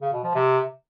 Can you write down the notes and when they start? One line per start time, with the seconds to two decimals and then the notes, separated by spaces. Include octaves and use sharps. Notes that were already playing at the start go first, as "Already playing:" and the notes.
0.02 C#3
0.13 B2
0.24 F3
0.35 C3